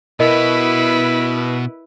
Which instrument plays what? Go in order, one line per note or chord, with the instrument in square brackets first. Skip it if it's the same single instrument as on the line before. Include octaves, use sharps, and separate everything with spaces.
[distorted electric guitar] B2 [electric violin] E4 B4 [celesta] A#4 D#5